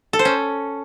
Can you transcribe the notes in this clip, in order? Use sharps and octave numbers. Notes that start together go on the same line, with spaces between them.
A4
C5
C#4